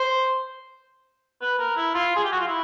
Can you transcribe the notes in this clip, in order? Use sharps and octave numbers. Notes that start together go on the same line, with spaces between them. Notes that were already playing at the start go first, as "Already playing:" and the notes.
Already playing: C5
B4
A#4
E4
F4
G#4
G4
F#4
F4
E4